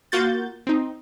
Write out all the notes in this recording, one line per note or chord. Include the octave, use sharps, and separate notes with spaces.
A#3 F4 F#4 G6 A6
C4 D#4